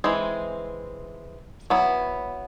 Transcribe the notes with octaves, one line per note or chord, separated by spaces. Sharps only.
E3 G#3 C4
F#3 B3 E4